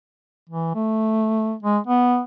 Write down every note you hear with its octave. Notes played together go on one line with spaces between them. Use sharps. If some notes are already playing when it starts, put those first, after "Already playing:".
E3
A3
G#3
B3